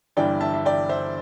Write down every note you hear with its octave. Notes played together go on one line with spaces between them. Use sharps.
G1 G2 E3 G3 D5 G5
E5 A5
E5
D5 G5
C5 E5